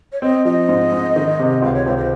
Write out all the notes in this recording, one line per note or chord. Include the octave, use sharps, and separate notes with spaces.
C#5
C4 D#5
F3 D#5
G#2
G#2
D#3
C3
C#2 F5
C#5
C#2 C5
C5